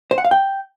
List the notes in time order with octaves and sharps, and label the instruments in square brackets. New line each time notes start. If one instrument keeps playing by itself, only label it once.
[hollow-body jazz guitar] C5
F#5
F5
G5